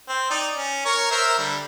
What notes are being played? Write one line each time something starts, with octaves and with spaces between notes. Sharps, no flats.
C4
D#4 D5
C#4
A#4 C#5
A#4 C5 E5
D3 G3